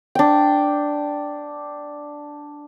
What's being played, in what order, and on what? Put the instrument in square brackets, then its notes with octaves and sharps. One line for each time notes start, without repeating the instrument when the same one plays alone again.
[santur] D4 G5